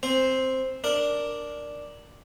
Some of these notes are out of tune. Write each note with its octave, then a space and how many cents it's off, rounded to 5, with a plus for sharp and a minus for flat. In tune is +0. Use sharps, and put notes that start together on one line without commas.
C4 +0 C5 +0 G#5 -40
D4 +0 A#4 +0